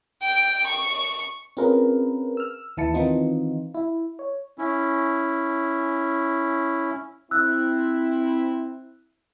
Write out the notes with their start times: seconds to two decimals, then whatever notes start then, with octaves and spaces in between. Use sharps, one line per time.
0.21 G5
0.66 C#6
1.57 C4 C#4 F4 G#4 A#4 B4
2.37 E6 F6
2.77 D#2 E3 E4 A5 C#7
2.94 D#3 E3 B3 C4 D#4 F4
3.74 E4
4.19 C#5
4.58 C#4 E4
7.31 C4 E4 E6 F#6